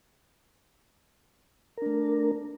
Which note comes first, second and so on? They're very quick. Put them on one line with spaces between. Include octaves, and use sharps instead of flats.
A#4 D4 A3